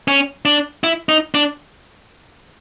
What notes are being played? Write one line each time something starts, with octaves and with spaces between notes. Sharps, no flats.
C#4
D4
E4
D#4
D4